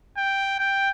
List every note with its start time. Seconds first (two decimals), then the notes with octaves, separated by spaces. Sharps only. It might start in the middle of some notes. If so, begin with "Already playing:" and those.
0.18 G5
0.59 G5